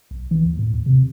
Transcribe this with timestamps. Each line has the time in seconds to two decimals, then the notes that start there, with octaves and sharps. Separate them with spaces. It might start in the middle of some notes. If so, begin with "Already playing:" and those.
0.11 B1
0.31 E3
0.45 D#2
0.59 A2
0.74 D#2
0.86 C3